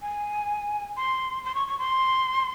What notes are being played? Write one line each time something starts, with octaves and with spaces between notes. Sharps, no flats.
G#5
C6
C6
C#6
C#6
C6